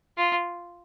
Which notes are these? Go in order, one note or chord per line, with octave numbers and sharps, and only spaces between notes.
F4